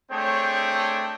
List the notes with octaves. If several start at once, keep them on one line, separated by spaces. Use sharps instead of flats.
A3 C4 D4 G#4 C#5 G5